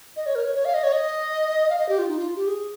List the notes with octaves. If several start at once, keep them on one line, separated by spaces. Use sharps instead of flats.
D#5
C#5
A#4
C#5
C#5
F5
D#5
C#5
D#5
F5
D#5
G4
F4
D#4
F4
G4
G#4